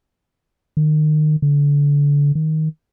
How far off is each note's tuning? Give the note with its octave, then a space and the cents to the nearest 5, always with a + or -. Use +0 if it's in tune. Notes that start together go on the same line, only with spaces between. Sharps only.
D#3 -30
D3 -30
D#3 +10